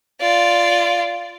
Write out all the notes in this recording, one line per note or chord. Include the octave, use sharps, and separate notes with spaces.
F4 D5